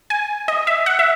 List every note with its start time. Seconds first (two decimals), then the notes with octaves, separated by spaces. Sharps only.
0.10 G#5
0.48 D#5
0.67 E5
0.86 F#5
0.99 E5